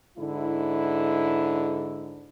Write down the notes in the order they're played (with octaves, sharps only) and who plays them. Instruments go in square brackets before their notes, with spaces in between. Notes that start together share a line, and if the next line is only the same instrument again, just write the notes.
[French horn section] G#2 D3 E4